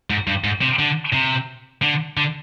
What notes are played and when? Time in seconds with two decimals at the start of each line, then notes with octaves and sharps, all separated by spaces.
0.10 G#2
0.27 G2
0.44 G#2
0.62 C3
0.79 D3
1.13 C3
1.82 D3
2.17 D3